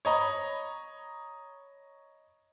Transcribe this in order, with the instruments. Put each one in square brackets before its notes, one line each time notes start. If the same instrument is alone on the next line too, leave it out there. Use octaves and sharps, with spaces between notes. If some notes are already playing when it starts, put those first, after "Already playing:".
[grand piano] C#5 D#5 A#5 B5